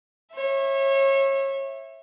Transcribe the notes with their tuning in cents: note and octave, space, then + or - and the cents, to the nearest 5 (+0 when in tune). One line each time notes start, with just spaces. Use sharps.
C#5 -30 E5 +0